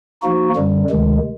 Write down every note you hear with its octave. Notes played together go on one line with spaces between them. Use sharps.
F3 A#3 D#4 F#4
F#2 D3 G3
D2 C3 D#3 G#3